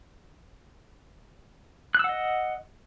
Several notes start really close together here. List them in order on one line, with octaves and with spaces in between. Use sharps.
F#6 E6 F#5 D#5